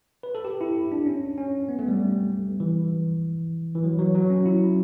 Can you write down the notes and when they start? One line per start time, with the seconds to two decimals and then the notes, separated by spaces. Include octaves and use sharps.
0.23 B4
0.35 A4
0.45 G4
0.61 E4
0.92 D4
1.06 C#4
1.38 C#4
1.69 B3
1.79 A3
1.88 G3
2.00 G3
2.60 E3
3.75 E3
3.84 F#3
3.99 F#3
4.15 F#3
4.30 C#4
4.46 E4